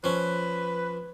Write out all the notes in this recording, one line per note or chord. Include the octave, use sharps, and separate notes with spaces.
F3 C#4 B4